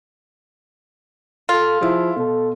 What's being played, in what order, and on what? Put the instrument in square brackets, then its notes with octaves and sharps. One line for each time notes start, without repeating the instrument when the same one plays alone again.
[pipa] F4 [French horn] A4
[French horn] F3 [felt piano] E4 G#4
[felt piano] B2 [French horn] A4